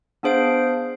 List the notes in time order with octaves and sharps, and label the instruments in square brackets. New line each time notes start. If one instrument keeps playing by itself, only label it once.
[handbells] B3 D4 G#4 C5 F5 D7